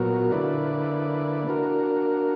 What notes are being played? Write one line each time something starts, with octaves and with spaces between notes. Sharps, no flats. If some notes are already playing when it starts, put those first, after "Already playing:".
Already playing: A#2 F#3 B3 F#4 A#4
D3 A#3 E4 B4 D5
A#3 D4 F#4 A#4